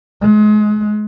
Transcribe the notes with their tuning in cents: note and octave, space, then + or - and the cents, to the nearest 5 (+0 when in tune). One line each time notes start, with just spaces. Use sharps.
G#3 +30